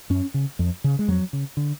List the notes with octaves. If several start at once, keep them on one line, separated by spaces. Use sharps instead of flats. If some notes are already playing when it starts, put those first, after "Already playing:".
F#2 C#4
C#3
F2
C#3
G#3
F2 F#3
C#3
D3